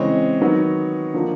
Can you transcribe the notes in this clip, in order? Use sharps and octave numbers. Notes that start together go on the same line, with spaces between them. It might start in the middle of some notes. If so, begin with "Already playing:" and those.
Already playing: C#3 E3 G#3 C4 C#5 D#5
D#3 F#3 B3
D3 F3 A#3